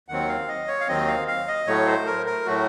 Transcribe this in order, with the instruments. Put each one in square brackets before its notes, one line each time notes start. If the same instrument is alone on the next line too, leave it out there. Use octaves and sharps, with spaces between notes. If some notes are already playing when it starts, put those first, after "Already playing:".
[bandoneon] D#2 D#3 F#3 C4 F#5
F5
D#5
C#5
F5
D#2 D#3 F#3 C4 D#5
F5
F5
D#5
A2 F#3 A3 C#5
C5
A#4
A#4
A2 F#3 A3 F#4